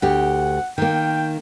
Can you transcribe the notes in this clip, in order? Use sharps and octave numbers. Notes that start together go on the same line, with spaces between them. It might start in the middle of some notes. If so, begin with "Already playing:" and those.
D2 G4 F#5
D#3 A#3 G5